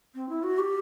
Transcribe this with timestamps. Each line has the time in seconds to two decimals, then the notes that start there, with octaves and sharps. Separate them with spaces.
0.15 C4
0.29 E4
0.43 F#4
0.59 G4